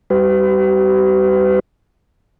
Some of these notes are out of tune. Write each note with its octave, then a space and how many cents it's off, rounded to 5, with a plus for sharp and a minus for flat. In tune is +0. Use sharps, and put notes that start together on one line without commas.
G3 +5 G4 -45 B4 +40